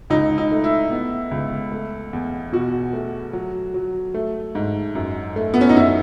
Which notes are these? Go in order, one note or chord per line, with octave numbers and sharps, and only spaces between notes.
C#2 D#4
D#4
A3
E4
B3
C#2
A3
E2
B2 F#4
A3
F#3
F#3
A3
G#2
F#2
A3
B3
C#4
D#4
F#2 E4